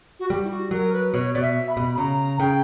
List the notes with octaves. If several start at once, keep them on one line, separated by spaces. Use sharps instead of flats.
F#4
G3 G4
E4
F#4
F#3 A#4
B4
B2 C#5
B2 D5
E5
B5
B2
B5
C#3 A#5
C#3 G5